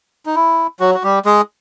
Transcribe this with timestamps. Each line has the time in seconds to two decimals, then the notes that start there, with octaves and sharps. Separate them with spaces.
0.26 D#4
0.36 E4
0.80 F#3 F#4
0.95 F#4
1.03 G3 G4
1.25 G#3 G#4